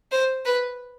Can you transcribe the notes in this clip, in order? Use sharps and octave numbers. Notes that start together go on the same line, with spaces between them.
C5
B4